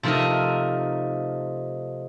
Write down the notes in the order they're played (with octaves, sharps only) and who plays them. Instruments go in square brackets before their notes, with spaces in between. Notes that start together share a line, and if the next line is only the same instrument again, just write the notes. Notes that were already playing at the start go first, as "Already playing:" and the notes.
[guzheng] C3 F3 A3 D#4 A4 A#4